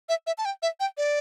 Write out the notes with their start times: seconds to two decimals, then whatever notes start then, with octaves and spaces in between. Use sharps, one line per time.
0.09 E5
0.27 E5
0.38 A5
0.45 G5
0.62 E5
0.80 G5
0.98 D5